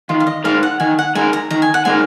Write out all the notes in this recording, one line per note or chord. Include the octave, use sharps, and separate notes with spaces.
D#3 F4
F5
D#5
G#3 D#4 A#4 F5
F#5
D#3 G#5
F#5
G#3 D#4 A#4 G#5
A#5
D#3 A#5
G#5
F#5
G#3 D#4 A#4 G#5